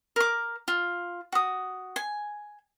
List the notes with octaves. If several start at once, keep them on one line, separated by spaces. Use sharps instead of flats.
A#4 D6
F4
F#4 D#6
G#5